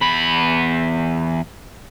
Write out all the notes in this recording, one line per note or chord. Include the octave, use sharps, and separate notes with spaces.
E2 B5